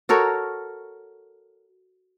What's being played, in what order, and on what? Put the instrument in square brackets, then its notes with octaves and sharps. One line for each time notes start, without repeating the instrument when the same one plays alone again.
[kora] F#4 A4 A#4 C#5